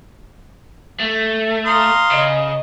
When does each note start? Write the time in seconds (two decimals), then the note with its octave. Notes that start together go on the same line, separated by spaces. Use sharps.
0.99 A3
1.66 F5 A#5 C6 D#6
2.11 C#3 D#5